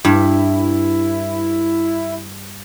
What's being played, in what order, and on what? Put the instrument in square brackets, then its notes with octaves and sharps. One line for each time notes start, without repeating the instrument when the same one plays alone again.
[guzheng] G2 [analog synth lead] E4